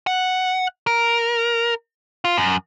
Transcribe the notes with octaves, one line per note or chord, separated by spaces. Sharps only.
F#5
A#4
F4
F#2